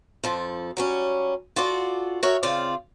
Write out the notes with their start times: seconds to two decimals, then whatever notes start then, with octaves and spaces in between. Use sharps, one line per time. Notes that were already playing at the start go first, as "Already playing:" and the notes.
0.24 F2 F3 A4
0.77 F#3 G3 C#4
1.56 F4 F#4 A4 D5
2.23 F#4 A#4 C#5 E5
2.43 C#3 C4 F4 D5 F5